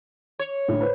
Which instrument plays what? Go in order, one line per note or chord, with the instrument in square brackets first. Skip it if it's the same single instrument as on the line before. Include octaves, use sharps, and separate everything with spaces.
[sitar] C#5
[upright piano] A2 D3
B4 C5